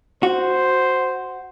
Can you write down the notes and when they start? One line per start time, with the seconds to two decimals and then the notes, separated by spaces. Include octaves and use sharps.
0.23 F#4 C5